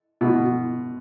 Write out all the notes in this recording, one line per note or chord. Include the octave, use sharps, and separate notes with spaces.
B2